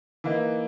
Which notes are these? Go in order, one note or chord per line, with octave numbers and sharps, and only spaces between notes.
E3 A#3 D#4